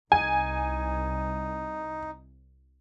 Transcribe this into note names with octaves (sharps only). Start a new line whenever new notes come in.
C2 D#4 G#5